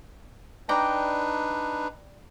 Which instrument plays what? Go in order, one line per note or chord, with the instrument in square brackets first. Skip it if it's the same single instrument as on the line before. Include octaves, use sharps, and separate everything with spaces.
[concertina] D4 D#4 B4 [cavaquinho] D5 G5 A#5